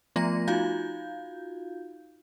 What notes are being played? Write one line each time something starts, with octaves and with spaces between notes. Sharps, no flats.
F3 A3 B3 F4 A#5 A#6
D#4 F4 F#4 F5 G6